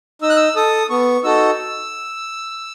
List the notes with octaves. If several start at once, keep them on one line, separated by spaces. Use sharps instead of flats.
D#4 E6
F#6
E6
A4 D#6
B3 C#6
D#4 F#4 A4 E6